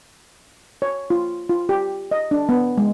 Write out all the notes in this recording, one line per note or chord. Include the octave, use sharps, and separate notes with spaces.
C#5
F4
F4
G4
D#5
D4
B3
G#3